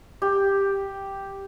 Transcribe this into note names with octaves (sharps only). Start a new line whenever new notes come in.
G4